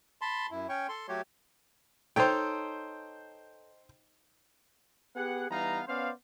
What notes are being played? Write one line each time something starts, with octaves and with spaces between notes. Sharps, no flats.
A5 B5 C6
F#2 E4
C#4 C#5 G5 C#6
A4 C6
F#3 A3 F#4 G4 C#5
D#4 A4 C5 C#5 G5
B3 G4 G#4 F#5
E3 G3 B3 D#4 F5 A#5
B3 C#4 C5 D5 F5